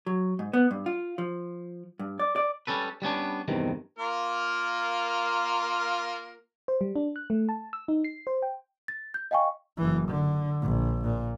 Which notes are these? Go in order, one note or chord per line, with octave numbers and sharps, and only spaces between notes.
F#3
G#2
B3
G2
F4
F3
G2
D5
D5
G3 C#4 A4 B4
G3 B3 C#4 D4
E2 G2 C3 D#3
A#3 F4 A#4
C5
G3
D4
F#6
A3
A5
E6
D#4
C7
C5
G5
A6
G6
D#5 F5 G5 G#5 C#6
F#1 E3
D3
A#1
A#2